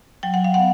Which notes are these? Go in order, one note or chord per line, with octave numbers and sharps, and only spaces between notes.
F#3 G5
F#5
F5
B3 F#5